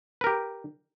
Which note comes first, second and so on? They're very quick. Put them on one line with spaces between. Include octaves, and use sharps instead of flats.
B4 A#4 G4